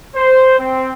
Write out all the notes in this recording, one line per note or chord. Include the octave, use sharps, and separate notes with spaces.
C5
C4